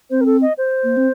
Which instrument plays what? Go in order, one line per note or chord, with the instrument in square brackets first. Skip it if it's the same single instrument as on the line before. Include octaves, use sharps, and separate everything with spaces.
[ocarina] C4 [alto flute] C5
[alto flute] A#4
A4
D#5
C5
[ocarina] A#3
C4